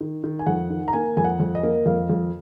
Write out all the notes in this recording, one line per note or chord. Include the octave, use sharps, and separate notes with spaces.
D#3
D#3
G#5
F2 F#5
D#3
A#5
A#3 G#5
F2 G#5
F#5
F2
D#5
A#3
F2 F5
F2